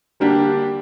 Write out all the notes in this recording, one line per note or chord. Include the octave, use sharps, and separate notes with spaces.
D3 G3 A#3 D4 G4